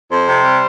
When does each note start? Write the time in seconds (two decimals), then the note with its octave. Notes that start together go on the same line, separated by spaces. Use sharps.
0.09 F2 C5
0.27 C3
0.44 G3